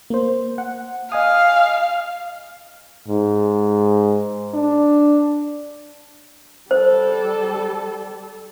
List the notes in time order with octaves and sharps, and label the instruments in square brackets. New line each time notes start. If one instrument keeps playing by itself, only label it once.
[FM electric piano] A#3 C5
F#5
[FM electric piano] D#5 G#5 D#6 [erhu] F5
[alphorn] G#2
D4
[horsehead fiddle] G3 A4 [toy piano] C5